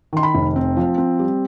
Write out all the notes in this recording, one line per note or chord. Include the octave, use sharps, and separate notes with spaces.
D#3 C6
B5
F1
C4
F3
C4
G3